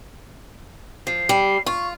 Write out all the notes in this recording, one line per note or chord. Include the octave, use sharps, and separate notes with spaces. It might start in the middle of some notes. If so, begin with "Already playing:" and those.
F3 C7
G3
F4 C#6